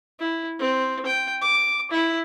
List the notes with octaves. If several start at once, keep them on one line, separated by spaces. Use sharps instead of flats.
E4
C4
G5
D6
E4